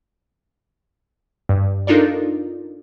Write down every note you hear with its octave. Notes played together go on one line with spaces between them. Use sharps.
G2
D4 D#4 F4 A4 A#4 D5